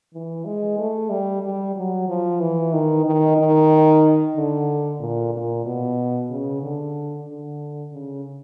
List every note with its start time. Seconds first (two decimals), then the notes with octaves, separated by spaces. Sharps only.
0.14 E3
0.45 G#3
0.79 A3
1.10 G3
1.42 G3
1.76 F#3
2.08 F3
2.40 E3
2.73 D#3
3.05 D#3
3.37 D#3
4.36 D3
5.00 A#2
5.33 A#2
5.65 B2
6.30 C#3
6.62 D3
7.28 D3
7.93 C#3